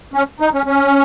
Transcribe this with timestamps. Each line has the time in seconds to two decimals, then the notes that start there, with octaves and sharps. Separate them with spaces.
0.14 C#4
0.40 D#4
0.54 C#4
0.66 C#4